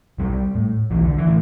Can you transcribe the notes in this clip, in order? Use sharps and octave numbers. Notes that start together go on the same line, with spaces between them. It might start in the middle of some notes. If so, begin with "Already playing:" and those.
B1 G3
A2
B1 E3
D3
E3
A2